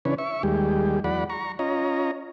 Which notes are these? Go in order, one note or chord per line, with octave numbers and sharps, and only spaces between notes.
C#3 E3 C#4 D4 B4 C#5
E5 C#6
D#2 G3 G#3 G4
E2 F#3 D5 F#5 B5
A#5 C#6
C#4 F4 C#5 D#5 A#5